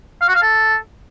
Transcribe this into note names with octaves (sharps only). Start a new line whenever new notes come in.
F5
F#4
F5
A4